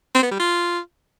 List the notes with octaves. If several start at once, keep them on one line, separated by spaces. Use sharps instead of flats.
C4
B3
G3
F4